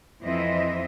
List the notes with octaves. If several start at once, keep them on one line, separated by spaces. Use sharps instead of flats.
F2 E3 C4 C5 D#5 E5